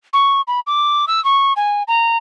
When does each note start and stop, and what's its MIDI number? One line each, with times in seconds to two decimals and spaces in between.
0.13 0.41 85
0.48 0.60 83
0.67 1.05 86
1.08 1.23 88
1.24 1.53 85
1.56 1.83 80
1.88 2.17 82